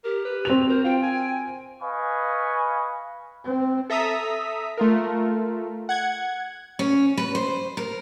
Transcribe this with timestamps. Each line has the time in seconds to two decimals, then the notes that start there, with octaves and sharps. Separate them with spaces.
0.05 G4 A#4
0.25 B4
0.45 C4 F#4 F7
0.69 A#4 C5
0.84 F4 G5
1.02 G#5
1.82 B4 D#5 F5 G#5 C#6
3.44 C4
3.90 A4 E5 A#5 D#6 B6
4.77 A3 F4 A#4
5.89 F#5 G#6
6.79 C#4
7.17 B4
7.35 C5
7.77 A#4